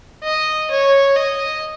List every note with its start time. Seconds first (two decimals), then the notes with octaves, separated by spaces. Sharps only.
0.24 D#5
0.71 C#5
1.16 D#5